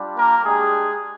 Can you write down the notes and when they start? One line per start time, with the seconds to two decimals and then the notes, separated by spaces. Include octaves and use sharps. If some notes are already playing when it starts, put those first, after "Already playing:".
Already playing: G3 D4 F4
0.17 A#3 A#4
0.46 G#3 D4 G4 G#4